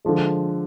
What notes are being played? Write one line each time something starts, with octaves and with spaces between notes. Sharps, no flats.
D3 F3 G#3